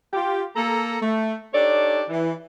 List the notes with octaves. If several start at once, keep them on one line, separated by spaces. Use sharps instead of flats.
F4 G4
A#3 A4 A#5
A3
D4 D#4 G4 A4 C#5 D5
E3